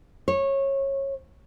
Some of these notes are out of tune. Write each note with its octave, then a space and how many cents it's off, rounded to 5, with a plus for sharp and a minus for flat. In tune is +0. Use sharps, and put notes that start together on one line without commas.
C#5 -20